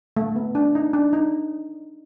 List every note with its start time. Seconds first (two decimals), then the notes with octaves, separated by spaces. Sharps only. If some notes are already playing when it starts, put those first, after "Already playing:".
0.17 A3
0.36 B3
0.55 D4
0.75 D#4
0.93 D4
1.13 D#4